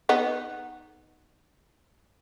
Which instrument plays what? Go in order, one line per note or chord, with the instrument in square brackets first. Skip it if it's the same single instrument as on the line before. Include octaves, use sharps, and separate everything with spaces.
[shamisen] B3 D#4